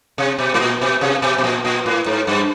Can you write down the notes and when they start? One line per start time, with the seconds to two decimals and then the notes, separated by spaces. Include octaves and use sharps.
0.18 C3
0.39 B2
0.54 A2
0.60 A#2
0.81 B2
1.01 C3
1.22 B2
1.38 B2
1.44 A#2
1.65 A#2
1.86 A2
2.06 G#2
2.27 G2